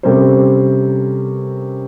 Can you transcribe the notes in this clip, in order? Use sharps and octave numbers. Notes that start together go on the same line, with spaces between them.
C3 G3 C#4 A4 A#4 C5